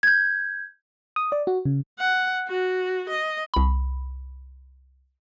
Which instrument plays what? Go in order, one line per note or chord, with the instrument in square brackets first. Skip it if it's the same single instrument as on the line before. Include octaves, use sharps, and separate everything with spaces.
[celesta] G6 G#6
[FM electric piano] D#6
D5
F#4
C#3
[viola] F#5
F#4
D#5
[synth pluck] C2 B5